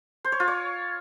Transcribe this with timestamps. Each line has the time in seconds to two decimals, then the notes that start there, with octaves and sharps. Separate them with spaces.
0.24 C5
0.32 C#5
0.40 F4
0.48 C#5